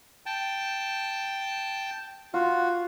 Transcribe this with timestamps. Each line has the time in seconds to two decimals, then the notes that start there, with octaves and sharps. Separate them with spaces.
0.26 G5 A5
2.34 F4 F#4